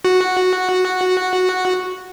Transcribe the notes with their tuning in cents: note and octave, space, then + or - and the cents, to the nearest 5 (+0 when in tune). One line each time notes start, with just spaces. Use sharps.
F#4 -5